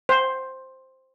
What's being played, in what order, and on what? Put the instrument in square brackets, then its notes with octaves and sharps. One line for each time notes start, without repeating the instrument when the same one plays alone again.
[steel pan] C5